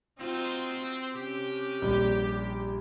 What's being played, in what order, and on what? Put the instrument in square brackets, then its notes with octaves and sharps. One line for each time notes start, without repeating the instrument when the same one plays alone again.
[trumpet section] C4 [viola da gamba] D#4 F4 F#4
[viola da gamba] C3 C#4 [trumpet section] G4
[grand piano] A#1 G3